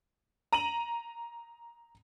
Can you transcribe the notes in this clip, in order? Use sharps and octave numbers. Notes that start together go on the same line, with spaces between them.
A#5 D#7 F#7